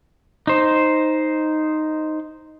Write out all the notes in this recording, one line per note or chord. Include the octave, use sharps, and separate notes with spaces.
D#4 C5